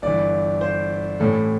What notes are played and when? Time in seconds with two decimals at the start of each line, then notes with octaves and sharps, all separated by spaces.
0.02 G1 G2 E3 D5
0.61 C5
1.20 A1 A2 E3 A4